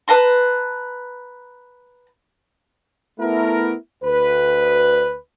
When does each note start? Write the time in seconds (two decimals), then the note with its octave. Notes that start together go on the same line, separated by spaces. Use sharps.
0.08 B4 A5 A#5 C6
3.20 A3 B3 E4 A#4
4.04 D2 B4